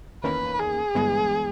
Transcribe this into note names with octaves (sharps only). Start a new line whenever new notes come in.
E2 D#3 A#3 C#4 B4
G#4
G1 G2 E3 G#3 B3